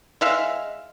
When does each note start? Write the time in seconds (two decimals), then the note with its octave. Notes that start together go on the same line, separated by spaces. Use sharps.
0.21 G#3 E5 F5